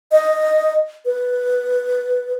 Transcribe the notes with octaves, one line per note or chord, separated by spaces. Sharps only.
D#5
B4